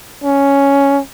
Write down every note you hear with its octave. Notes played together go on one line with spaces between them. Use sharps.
C#4